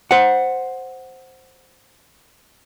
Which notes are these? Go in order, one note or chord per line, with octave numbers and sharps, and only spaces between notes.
C5 F#5